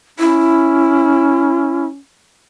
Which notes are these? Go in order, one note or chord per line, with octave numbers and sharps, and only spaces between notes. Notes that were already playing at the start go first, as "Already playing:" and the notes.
C#4 E4